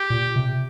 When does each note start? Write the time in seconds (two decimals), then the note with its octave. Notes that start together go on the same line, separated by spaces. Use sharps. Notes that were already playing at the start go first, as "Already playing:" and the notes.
Already playing: G4
0.10 A#2
0.36 C3